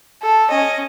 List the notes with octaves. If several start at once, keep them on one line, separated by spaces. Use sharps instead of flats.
A4
C#4 D#5